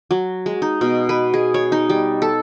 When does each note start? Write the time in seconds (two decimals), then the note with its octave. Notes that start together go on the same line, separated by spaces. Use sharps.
0.11 F#3
0.46 G#3
0.62 D#4
0.81 B2
1.09 B4
1.34 G#4
1.54 C#5
1.72 D#4
1.89 G3
2.22 A4